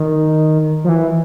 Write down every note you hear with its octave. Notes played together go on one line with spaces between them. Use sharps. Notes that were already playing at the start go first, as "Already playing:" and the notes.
Already playing: D#3
F3
E3